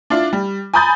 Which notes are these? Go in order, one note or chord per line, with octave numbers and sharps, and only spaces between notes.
D4 E4 F4
G3
G#5 A#5 B5 D#6 G6 A6